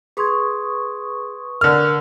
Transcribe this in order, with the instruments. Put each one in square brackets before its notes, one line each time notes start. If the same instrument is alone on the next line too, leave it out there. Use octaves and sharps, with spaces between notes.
[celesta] G#4 C6 G#6 [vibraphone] B4 C#6 D#6
[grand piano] D3 F6 [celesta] A#4